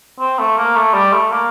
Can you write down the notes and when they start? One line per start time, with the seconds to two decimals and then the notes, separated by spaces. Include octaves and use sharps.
0.20 C4
0.39 A3
0.57 A#3
0.76 A3
0.94 G3
1.13 A3
1.31 A#3